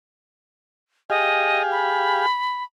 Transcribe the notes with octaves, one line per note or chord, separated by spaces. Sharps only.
G4 G#4 D#5 F5
B5